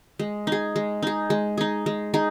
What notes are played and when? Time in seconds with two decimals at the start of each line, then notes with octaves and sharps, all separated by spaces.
0.19 G#3
0.47 D#4 G#4
0.76 G#3
1.03 D#4 G#4
1.30 G#3
1.58 D#4 G#4
1.86 G#3
2.14 D#4 G#4